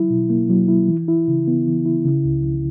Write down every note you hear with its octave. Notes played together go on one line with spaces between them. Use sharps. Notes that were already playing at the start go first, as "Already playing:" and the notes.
Already playing: F#3 E4
B2
A#3
F#3
E4
E3
E4
C#3
B3
E3
E4
C#3
C#2
C#2